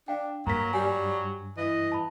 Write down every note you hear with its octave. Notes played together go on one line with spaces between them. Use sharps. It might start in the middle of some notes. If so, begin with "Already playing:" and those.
D4 F5 G5
G2 F#3 A#3 A#5 B6
G3 G#5
E3 D#5
A5 B5